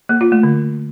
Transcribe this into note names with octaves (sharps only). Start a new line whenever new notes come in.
A#3
F4
A3
D3